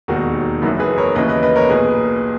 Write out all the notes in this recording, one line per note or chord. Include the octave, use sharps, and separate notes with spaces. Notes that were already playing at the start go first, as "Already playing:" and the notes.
E1 D#2 D#3 D#4 F#4
F#1 F#2 E3 B3 D#4
G#4 B4
A#4 C#5
D#2 C#3 E3 B4 D#5
B4 D#5
B4 D#5
A#4 C#5
B1 A#2 G#4 B4